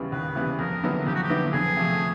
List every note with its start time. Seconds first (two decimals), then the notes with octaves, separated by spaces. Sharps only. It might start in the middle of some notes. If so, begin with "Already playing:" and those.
Already playing: D#2 C#3 E3 G3 B3
0.12 D#2 B4
0.35 C#3 E3 G3 B3
0.59 F2 A#4
0.83 D3 F#3 B3 E4
1.07 F2 G4
1.15 F#4
1.23 G4
1.29 D3 F#3 B3 E4
1.53 F2 G#4
1.77 C3 F3 A3